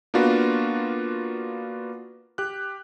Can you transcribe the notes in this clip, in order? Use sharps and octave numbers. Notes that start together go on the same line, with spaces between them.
A#3 B3 D4 F4 F#4 B4
G4 F#6